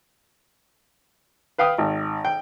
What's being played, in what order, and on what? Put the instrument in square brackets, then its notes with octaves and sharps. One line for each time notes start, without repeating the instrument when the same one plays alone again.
[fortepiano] B4 F5 G5 D#6
G#1
G5